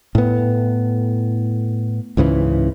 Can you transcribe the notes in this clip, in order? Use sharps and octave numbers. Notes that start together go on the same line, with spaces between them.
A2 B3
C#2 G#2 C#3 E3